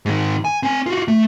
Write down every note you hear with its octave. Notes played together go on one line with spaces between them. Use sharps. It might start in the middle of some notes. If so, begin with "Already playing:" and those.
G#2 D#3
G#5
C4 G#5
F4 F#4
A3